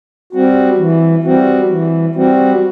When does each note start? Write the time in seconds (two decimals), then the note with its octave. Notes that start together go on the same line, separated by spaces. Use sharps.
0.33 G3 C4 F#4
0.78 E3
1.24 G3 C4 F#4
1.69 E3
2.15 G3 C4 F#4